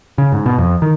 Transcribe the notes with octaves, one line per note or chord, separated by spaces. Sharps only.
C#3
G#2
B2
F2
D#3